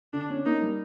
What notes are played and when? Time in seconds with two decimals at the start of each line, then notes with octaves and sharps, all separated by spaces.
0.13 D3 D4
0.30 C#4
0.46 A#3 D#4
0.62 G3